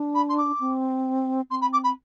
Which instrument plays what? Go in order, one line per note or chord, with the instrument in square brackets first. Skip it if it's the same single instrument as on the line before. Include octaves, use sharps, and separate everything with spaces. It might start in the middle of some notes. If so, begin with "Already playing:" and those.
Already playing: [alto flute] D4
[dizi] B5
C6
D6
[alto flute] C4
[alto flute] C4 [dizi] C6
[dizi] B5
D6
B5